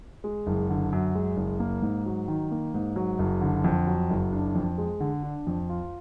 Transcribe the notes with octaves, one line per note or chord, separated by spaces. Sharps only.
G#3
F#1
D3
F#2
G#3
F#1
A#3
G#2
F#3
D#3
A#3
G#2
F#3
F#1
D3
F2
F#3
F#1
D4
F2
G#3
D3
D4
F2
F4